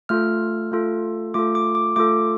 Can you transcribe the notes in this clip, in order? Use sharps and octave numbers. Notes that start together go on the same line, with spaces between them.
A3 F4 A4 F6
A3 F4 A4
A3 F4 A4 D6
D6
D6
A3 F4 A4 D6